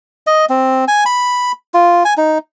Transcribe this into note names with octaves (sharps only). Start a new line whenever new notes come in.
D#5
C4
G#5
B5
F4
G#5
D#4